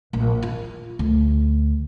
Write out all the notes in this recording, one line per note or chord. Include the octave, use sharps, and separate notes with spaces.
A#1
F4
D2